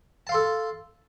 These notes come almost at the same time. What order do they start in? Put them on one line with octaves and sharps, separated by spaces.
A5 F5 C6 A4